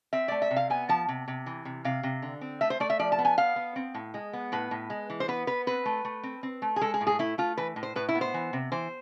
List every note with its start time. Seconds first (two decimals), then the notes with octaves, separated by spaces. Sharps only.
0.13 C4 E5
0.28 A3 D5
0.42 E5
0.51 C3
0.56 F5
0.70 B3 G#5
0.89 F3 A5
1.08 C3
1.28 C3
1.46 E3
1.65 C3
1.85 C3 F5
2.03 C3
2.22 D3
2.41 C4
2.61 A3 E5
2.70 C5
2.80 A3 D5
2.90 E5
2.99 F3 D5
3.12 A5
3.18 B3
3.25 G#5
3.37 B3 F5
3.56 B3
3.76 C4
3.94 A2
4.14 G#3
4.33 B3
4.52 A2 B4
4.71 A2
4.90 G#3
5.10 E3
5.20 C5
5.28 B3 B4
5.47 B3 B4
5.67 C4 B4
5.85 A3
6.05 A3
6.23 C4
6.43 C4
6.62 A3
6.76 G#4
6.81 G#3 A4
6.94 G#4
7.01 A2
7.07 G#4
7.19 A3 E4
7.38 A3 F4
7.57 E3 B4
7.76 A2
7.83 C5
7.96 A2 B4
8.09 E4
8.15 B3
8.21 C5
8.34 E3
8.53 C3
8.72 E3 C5